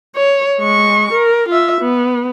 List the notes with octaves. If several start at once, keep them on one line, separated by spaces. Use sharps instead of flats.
C#5
G#3 C#6
A#4
F4 E5
B3